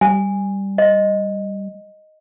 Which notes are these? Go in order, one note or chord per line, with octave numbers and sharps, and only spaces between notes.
G3 G#5
D#5